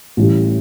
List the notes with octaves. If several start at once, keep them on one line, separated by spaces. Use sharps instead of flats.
A1 A2 G3